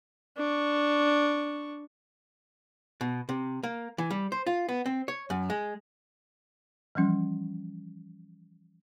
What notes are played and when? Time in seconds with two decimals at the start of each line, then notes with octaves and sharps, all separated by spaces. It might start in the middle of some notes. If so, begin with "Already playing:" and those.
0.37 D4 C#6
3.01 B2
3.29 C3
3.63 A#3
3.98 E3
4.11 G3
4.32 C5
4.47 F4
4.69 B3
4.86 C4
5.08 C#5
5.30 F#2
5.50 G#3
6.95 E3 F3 G3 C#4